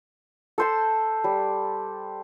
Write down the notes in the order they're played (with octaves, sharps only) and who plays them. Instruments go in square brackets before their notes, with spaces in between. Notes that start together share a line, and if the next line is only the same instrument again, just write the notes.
[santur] A4 C5 A5
G3